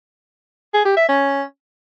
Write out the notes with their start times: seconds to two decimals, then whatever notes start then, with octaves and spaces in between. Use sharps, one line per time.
0.74 G#4
0.85 G4
0.97 E5
1.08 C#4